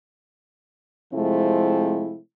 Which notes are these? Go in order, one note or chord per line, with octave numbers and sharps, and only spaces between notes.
C3 F3 G#3 A3 C4 E4